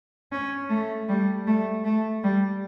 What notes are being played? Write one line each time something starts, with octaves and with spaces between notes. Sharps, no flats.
C#4
A3
G3
A3
A3
G3